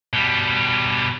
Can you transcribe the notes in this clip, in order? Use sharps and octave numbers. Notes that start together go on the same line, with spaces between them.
B2 G3